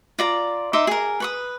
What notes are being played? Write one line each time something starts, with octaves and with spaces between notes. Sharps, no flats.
F4 D5 A#5
D#4 E5 C6 D6
G#4 A#4
B4 C#6 D#6